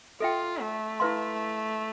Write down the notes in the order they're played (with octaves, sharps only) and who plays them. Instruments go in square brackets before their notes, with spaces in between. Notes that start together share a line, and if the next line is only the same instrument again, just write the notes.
[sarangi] F4 [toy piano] A4 E5 G5
[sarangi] A3
[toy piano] E4 B4 F5 C6